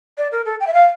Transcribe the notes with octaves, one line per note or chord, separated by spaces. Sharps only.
D5
A#4
A4
G5
E5
F5